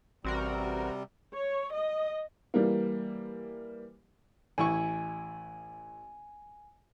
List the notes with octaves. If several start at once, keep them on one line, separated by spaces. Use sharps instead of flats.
A1 C3 G3 C4 F#4 A#4
C#5
D#5
E3 G3 A#3
A1 E4 G#5 C#6